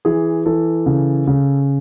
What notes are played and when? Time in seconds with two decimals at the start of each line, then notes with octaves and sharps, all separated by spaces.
0.05 E3 G#4
0.46 E3 A4
0.86 C#3
1.27 C#3